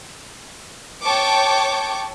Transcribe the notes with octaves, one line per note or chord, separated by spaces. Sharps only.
C#5 G5 A5 C#6 D6